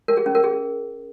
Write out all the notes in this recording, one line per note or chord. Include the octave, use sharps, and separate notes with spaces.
A#4
G#4
C#4
A#4
G#4